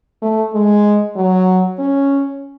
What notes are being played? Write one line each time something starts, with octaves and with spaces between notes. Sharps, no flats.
A3
G#3
F#3
C#4